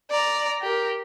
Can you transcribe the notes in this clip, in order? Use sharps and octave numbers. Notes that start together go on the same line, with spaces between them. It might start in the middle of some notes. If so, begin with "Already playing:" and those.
D5 A#5
G4 A#4